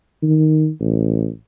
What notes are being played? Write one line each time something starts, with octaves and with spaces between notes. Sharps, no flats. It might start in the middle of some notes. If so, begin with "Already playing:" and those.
D#3
A1